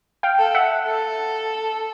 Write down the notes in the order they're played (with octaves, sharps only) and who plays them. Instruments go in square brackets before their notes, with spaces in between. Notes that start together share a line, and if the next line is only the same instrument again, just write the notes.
[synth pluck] F5 G5
[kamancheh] A4
[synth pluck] E5 F#5
[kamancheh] A4